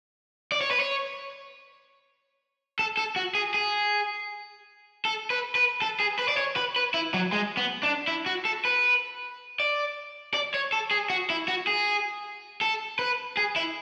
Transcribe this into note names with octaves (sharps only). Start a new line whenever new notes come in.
D5
C#5
B4
C#5
A4
A4
F#4
G#4
G#4
A4
B4
B4
A4
G#4
B4
D5
C#5
B4
B4
E4
F#3
G#3
B3
D4
E4
F#4
A4
B4
D5
D5
C#5
A4
G#4
F#4
E4
F#4
G#4
A4
B4
G#4
E4